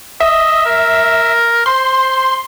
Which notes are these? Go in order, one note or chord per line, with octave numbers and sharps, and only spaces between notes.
D#5 E5
A#4
C5 C6